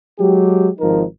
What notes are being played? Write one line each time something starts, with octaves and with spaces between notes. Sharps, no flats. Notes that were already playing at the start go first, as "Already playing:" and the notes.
F#3 G#3 G4
G#1 F3 D#4 A#4